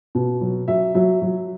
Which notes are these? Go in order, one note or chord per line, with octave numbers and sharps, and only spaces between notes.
B2
F#3
F#3 E5
F#3 E5
F#3